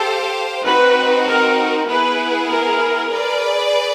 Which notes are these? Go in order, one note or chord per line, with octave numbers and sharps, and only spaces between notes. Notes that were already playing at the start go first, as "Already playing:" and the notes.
Already playing: G4 A4 C5 F5
C4 D#4 F#4 B4
A#4
B3 E4 G#4 B4
A#4
G#4 B4 D5